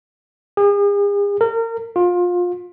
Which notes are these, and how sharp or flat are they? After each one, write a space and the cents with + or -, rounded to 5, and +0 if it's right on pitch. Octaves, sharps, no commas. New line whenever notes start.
G#4 -45
A#4 -30
F4 +25